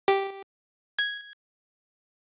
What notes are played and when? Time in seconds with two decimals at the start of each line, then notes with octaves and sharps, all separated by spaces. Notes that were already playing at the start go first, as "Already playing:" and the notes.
0.08 G4
0.99 G#6